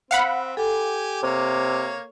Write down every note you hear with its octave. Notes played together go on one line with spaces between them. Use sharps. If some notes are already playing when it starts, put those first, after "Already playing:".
C4 F5 F#5 B5
G4 A4 G#5
C3 A#3 C#5